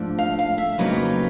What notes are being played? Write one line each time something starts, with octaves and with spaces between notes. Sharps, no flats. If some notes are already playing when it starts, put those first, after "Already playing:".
Already playing: G#2 F3 A3 D4
F5
F5
E5
F2 C#3 F#3 A#3 D#4 B4